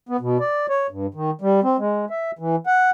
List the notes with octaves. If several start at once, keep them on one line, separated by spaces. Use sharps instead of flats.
B3
B2
D5
C#5
G2
D#3
G3
C4
G#3
E5
E3
F#5